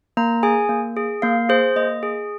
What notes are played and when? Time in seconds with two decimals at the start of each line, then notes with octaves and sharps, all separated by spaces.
0.17 A#3 A#5
0.43 G#4 G#5
0.69 A#3
0.97 G#4
1.22 A#3 F5
1.49 G#4 C5
1.76 A#3 D#5
2.03 G#4